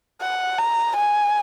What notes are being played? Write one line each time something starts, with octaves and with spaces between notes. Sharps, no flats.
F#5
A#5
G#5